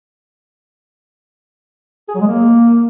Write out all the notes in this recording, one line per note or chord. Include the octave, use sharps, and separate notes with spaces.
G#4
F#3
G#3
A#3